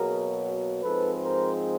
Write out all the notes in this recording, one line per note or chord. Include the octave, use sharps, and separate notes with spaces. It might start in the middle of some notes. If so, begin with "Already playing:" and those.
Already playing: B2 F#3 A#3 G#4 A#4
G#2 F3 G#3 C4 A4 B4
A#4 C5